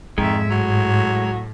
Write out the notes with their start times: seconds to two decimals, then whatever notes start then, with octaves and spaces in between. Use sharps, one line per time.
0.18 F2 G#2 D#3 G#3 E5
0.51 A2 F#3